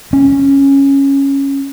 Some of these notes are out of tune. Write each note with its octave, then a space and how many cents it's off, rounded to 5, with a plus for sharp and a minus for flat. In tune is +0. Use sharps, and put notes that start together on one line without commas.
C#4 -5